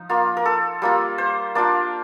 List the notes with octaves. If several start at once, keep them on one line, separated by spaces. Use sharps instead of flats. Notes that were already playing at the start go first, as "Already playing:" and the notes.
Already playing: F3 D#4
A#3 F4
A#4
A4
G3 A#3 F4
C5
A#3 D4 F4 D5